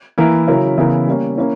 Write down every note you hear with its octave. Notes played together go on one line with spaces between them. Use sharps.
E3 A#3 E4 A#4
C#3 F#3 C#4 E4 A#4
C#3 E3 B3 E4 A#4
G3 A#3 C#4
A#3 C#4 E4